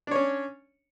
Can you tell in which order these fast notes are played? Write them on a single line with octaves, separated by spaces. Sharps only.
D4 C#5 C#4